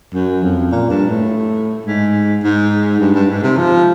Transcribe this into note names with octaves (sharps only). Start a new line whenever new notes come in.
F#2
F2
A#2
G2
A2
G#2
G#2
G2
G2
G#2
C3
F3